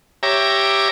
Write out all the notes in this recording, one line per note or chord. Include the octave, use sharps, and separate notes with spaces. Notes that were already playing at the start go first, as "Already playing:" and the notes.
G4 C#5 E5 A#5 D6